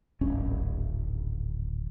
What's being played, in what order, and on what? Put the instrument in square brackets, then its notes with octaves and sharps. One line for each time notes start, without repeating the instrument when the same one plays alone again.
[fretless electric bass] D1 G#1 C#4